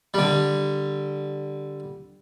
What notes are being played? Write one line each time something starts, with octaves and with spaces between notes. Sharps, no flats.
D3 G3